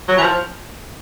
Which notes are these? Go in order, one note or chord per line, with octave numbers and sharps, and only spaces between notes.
F#3
E3
F3